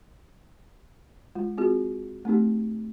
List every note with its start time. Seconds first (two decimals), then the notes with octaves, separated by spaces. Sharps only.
1.35 G#3 F4
1.58 C4 F4 F#4 G#4
2.25 A3 C4 D#4 G4